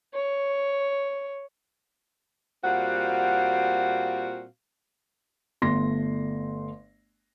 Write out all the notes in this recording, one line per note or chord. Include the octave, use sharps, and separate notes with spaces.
C#5
A#2 G3 C4 F#4 F5 F#5
G1 A3 C6 A#6